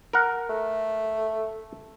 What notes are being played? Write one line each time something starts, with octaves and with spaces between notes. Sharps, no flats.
A#4 F#5
A3